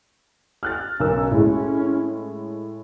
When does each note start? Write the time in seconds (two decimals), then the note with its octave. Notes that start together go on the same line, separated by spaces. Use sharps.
0.63 F6 F#6 A6
1.00 B1 C#4 A#4 E6
1.32 A2 G#3